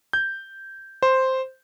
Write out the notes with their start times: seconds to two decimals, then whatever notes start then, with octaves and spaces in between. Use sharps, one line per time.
0.13 G6
1.02 C5